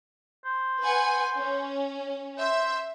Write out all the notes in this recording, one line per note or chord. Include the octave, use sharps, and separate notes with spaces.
C5
B4 F#5 G#5
C#4
C5 E5